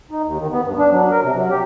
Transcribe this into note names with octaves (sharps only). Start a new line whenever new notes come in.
D#4
D#2
D#3
B3
G2
D4
F#3
A#4
C3
F#3
G4